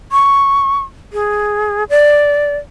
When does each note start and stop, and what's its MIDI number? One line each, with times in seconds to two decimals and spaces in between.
0.12 0.79 85
1.13 1.84 68
1.90 2.57 74